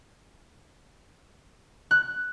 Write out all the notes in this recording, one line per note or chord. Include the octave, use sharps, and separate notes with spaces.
F#6